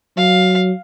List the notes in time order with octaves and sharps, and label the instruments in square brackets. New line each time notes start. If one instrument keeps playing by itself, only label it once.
[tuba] F#3 [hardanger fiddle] F5